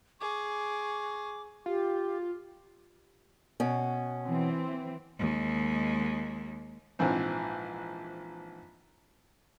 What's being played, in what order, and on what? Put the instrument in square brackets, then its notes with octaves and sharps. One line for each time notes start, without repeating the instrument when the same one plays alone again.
[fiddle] G#4 [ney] C#6 [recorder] D6
[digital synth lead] F4 [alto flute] G4
[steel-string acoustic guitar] B2 C#4
[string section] E3 C4
[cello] D#2 G#3
[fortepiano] A#1 G#2 E3 C4